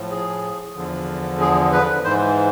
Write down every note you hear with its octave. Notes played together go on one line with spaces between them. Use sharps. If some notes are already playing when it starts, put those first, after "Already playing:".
Already playing: A2 F3
G#4
E2 D3 F3
G#4
B4
G#2 E3 C5